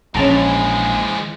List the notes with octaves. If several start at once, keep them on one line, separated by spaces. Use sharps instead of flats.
A#1 E3 F3 G#3 C#4 A5 A#5